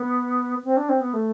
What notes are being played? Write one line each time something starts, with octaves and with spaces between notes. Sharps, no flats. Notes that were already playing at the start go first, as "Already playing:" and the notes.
Already playing: B3
C4
D4
C4
B3
A3